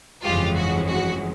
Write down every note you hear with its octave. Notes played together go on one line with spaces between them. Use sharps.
G1 F2 C#3 E3 G#3 F4 G4
F#4
F#4